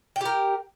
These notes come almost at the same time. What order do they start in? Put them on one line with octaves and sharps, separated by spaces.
G5 G4 A#4